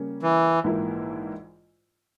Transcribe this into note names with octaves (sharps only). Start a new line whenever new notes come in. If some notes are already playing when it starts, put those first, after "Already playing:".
Already playing: C#3 G3 A#3 C#4
E3
A#1 G#2 E3 A#3 E4